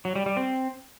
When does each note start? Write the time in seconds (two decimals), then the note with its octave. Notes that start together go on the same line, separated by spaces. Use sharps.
0.05 F#3
0.16 G3
0.26 G3
0.37 C4